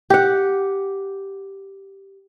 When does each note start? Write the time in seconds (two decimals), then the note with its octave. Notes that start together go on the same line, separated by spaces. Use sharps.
0.10 G4 F#5